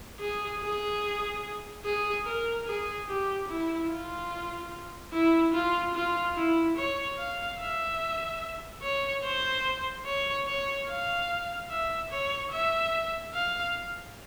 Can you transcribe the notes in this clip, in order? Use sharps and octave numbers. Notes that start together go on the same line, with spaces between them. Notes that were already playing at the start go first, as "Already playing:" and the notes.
G#4
G#4
G#4
A#4
G#4
G4
E4
F4
E4
F4
F4
E4
C#5
F5
E5
C#5
C5
C#5
C#5
F5
E5
C#5
E5
F5